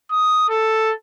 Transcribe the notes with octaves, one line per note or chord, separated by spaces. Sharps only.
D#6
A4